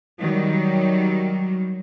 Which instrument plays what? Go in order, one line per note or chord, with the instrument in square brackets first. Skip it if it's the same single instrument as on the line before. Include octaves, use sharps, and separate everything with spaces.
[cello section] D#3 F#3 G3